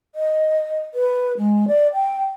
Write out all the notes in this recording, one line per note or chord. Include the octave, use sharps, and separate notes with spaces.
D#5
B4
G#3
D5
G5